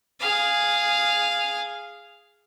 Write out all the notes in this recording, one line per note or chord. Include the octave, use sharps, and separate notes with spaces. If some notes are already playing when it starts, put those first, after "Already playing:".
G#4 F5